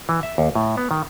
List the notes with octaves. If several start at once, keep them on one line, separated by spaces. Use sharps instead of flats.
E3
E5
D#2
A2
B3
D#3